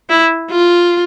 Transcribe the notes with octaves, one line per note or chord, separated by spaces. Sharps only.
E4
F4